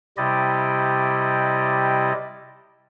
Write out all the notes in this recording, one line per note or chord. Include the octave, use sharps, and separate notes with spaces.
C3 G3 E4 G4 D5 D#5